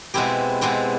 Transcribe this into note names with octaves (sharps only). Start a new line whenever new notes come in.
B2 G#3 C4 E4 G4
B2 G#3 C4 E4 G4